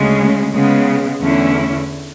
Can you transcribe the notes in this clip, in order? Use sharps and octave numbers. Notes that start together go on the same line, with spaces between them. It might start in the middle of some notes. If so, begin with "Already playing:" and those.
Already playing: D2 C#3 G#3 C#4
C#3 G#3 B3
E2 D3 A3 C#4 E4